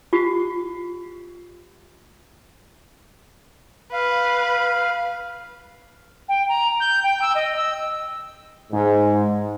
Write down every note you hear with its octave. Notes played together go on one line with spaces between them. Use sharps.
F4 G4
B4 F5
G5
A#5
G6
G5
E6
D#5
E6
G#2